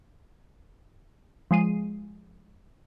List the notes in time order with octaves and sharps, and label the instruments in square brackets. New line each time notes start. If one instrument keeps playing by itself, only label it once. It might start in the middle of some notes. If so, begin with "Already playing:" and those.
[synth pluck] F3 G#3 C7 D#7